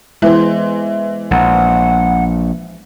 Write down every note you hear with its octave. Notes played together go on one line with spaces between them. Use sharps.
E3 G#3 B3 C5
A#1 F#5